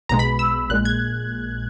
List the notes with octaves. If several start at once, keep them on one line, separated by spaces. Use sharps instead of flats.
B1 B2 G#3 A#5
B5
E6
A#1 A#2 G#3 F#6
G#6